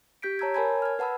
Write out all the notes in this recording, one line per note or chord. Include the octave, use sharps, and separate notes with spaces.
G4 G6 B6 D7
C#5 A5 A#5 E6 G6 G#6
A#4 C#5 G#5 A5 B5 G#6
F6 G#6
B4 F#5 A5 B5 E6